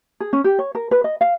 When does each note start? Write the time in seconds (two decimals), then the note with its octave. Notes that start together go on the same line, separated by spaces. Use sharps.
0.20 G#4
0.33 C#4
0.44 G4
0.59 C#5
0.75 A#4
0.91 B4
1.04 D#5
1.21 F5